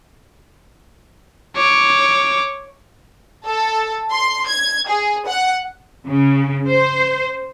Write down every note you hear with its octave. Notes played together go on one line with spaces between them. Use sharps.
C#5 D6
A4
C6
G#6
G#4
F#5
C#3
C5